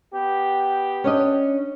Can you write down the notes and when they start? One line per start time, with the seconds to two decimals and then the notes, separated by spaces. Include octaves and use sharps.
0.13 B3 G4
1.04 C#4 D4 D#5